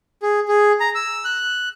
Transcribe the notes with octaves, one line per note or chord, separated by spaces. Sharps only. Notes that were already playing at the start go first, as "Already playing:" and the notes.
G#4
G#4
A#5
E6
F#6